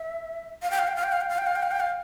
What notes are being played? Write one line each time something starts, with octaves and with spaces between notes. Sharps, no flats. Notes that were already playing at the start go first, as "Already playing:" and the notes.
Already playing: E5
F5
G5
F5
G5
F5
G5
F5
G5
F5
G5
F5
G5
F5
G5
F5